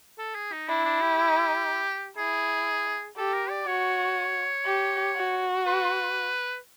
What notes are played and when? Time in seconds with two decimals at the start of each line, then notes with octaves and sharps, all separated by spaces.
0.19 A4
0.35 G#4
0.52 D#4
0.68 D4 E4
0.85 D4
1.02 G4
1.18 G4
2.17 E4 G#4
3.18 G4 A4
3.33 A#4
3.50 D5
3.67 F#4 C#5
4.66 G4
5.16 F#4
5.67 B4